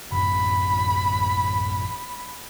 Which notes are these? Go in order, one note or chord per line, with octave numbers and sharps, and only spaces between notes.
A1 F#2 E3 B5